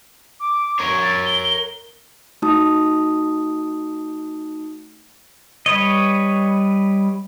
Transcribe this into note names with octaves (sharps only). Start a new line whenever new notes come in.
D6
A#4 C#5
A6
G7
A3 D#4 F#4 A5 D#6
G3 B4 C#5 D#5